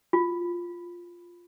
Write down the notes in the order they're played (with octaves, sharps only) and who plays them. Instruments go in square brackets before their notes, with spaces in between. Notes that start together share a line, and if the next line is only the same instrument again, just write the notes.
[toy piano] F4